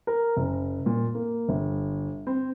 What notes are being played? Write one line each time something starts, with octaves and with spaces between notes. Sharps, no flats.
A#4
F#1
A#2
A#3
G1
C4